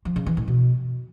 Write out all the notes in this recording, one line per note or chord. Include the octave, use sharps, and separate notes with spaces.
F3
C#3
E3
A2
B2